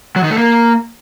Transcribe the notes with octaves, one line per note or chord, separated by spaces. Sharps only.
F#3
D#3
A3
A#3